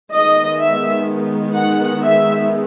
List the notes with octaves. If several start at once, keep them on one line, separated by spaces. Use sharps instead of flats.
D#3 G#3 B3 D#5
E5
F#5
E5